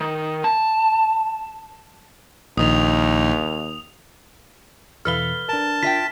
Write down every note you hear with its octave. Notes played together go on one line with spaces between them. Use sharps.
D#3
A5
A#1 D#2 D#3 D#6 F7
E2 B2 E3 A4 B4 F5 F6 G7
D4 A#4 A5
F4 E5 G5 B6